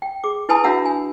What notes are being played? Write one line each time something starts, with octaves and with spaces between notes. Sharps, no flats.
G5
G#4 D6
E4 B4 G#5 A5 B5 D#6
D4 F#4 E5 F#5 A#5 E6
G#5